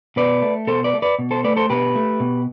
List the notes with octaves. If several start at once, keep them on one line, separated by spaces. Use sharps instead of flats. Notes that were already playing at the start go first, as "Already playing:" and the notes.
B2 B4 D5
A3
B2 A4 C5
B4 D5
A3
B4 D5
B2
A4 C5
A3 B4 D5
A4 C5
B2 G4 B4
A3
B2